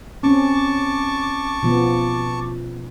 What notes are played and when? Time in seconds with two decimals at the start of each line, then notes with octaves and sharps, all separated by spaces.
0.23 C4 C#4 A5 C#6 D6
1.63 B2 F3 B3